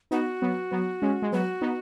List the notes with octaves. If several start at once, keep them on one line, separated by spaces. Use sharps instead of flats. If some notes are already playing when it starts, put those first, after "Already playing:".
B3 D#4 F#4
F#3 B3
F#3 B3
G#3 C#4
G#3
F#3 B3 F#4
B3 D#4